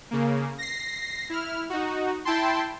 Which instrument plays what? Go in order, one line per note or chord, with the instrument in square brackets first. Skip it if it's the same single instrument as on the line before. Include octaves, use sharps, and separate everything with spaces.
[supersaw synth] C#3 A#3
A#6 C7
E4 F6
D#4 F#4
E4 G5 A5 C6